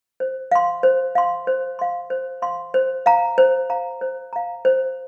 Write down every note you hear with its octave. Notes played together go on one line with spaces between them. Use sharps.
C5
F5 C6
C5
F5 C6
C5
F5 C6
C5
F5 C6
C5
F5 A#5
C5
F5 A#5
C5
F5 A#5
C5